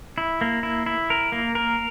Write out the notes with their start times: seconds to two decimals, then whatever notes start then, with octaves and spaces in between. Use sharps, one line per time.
0.18 E4
0.41 A#3
0.63 E4
0.86 E4
1.10 A#4
1.32 A#3
1.55 A#4